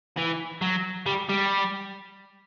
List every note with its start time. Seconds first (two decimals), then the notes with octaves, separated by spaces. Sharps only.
0.17 E3
0.62 F#3
1.06 G3
1.29 G3